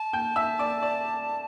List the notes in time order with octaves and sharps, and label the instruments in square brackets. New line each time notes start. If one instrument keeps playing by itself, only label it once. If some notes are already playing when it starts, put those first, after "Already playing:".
Already playing: [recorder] A5
[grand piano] G5 G6
E5 E6
D5 D6
D5